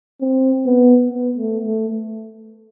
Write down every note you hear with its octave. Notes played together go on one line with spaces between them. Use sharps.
C4
B3
B3
A3
A3